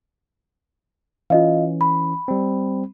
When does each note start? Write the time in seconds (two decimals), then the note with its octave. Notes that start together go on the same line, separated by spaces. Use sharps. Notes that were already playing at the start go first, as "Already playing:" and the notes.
1.30 E3 C#4 F4 D#5 F5
1.81 B5
2.28 G3 C4